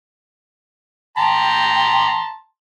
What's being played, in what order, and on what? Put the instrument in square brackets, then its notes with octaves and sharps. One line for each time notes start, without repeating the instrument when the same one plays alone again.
[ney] G5 [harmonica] A5 A#5 C6